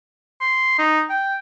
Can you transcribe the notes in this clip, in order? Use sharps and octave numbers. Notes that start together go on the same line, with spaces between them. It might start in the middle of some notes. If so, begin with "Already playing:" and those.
C6
D#4
G5